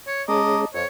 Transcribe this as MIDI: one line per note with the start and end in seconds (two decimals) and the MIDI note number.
0.07 0.23 73
0.28 0.65 56
0.28 0.65 61
0.28 0.65 68
0.28 0.66 75
0.28 0.63 81
0.28 0.63 82
0.28 0.63 86
0.74 0.84 41
0.74 0.87 73